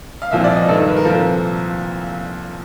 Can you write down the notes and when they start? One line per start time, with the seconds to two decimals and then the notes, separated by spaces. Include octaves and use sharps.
0.22 F5
0.31 C2 A#2 F3 E5
0.44 D5
0.56 D#5
0.68 G2 D#3 A4
0.77 A#4
0.88 B4
0.97 A#4
1.05 C2 A#2 F3 A4